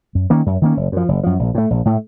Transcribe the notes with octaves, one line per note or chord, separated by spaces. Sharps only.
F#2
D#3 A#3 C#4
F#2
D#3 A#3 C#4
F#1
F#2 F3
F#1
F#2 F3
A#1
A2 A3
A#1
A2 A3